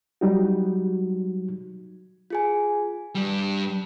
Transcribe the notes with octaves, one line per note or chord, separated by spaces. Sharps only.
F#3 G3 D#4 F#4
F4 G#4 G#5
G2 G3